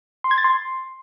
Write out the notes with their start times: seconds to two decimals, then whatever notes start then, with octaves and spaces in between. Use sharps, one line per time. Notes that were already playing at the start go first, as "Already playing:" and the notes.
0.24 C6
0.31 G#6
0.38 A6
0.44 C6